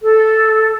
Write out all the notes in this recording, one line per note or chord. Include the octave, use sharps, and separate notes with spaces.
A4